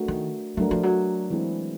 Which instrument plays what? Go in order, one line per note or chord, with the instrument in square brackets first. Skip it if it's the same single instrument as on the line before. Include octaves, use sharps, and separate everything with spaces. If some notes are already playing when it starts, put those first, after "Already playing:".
Already playing: [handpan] A3 D4 F#4 A#4
[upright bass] D#3
[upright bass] F#3 [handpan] A3 D4 F#4 A#4
[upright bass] F3
F#3
[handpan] E3 G#3 C4 E4 G#4